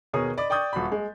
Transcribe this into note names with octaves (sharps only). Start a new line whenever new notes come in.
D#2 B2 G#4 A#4 C#5 D#6
D5 D#5 B5 D6
D5 G5 C#6 D#6 G6 A6
D#1 F#4 B5
G#3